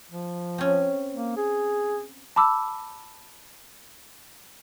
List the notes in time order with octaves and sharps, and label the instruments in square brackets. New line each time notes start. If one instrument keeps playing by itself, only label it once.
[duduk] F3
[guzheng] C4 C#4
[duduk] A#3
G#4
[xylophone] A5 B5 D6 E6